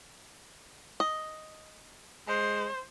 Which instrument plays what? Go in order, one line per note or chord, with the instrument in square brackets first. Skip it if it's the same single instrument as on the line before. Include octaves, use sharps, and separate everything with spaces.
[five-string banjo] D#5
[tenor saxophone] G#3 [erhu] C5